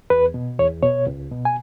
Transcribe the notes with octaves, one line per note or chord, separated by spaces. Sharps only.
E2 B4
B2
E2 C#5
B2 C#5
C#2
B2
G#5